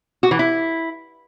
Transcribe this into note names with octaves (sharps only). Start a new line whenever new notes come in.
F#4
E3
E4